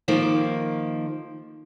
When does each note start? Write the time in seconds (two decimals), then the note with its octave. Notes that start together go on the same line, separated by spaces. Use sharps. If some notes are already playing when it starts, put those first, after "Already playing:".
0.08 D#3 F3 A#3